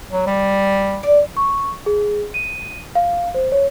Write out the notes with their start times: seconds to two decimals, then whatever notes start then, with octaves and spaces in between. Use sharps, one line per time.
0.12 F#3
0.27 G3
1.03 D5
1.37 C#6
1.86 G#4
2.34 D#7
2.95 F5
3.34 C5
3.52 C#5